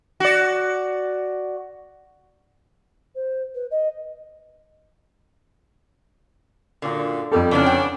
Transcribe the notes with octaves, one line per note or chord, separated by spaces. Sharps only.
F#4 D5
C5
B4
D#5
F#2 A#2 D3
F2 G3 A4
C#3 E3 A#3 B3 C#4 D4
G5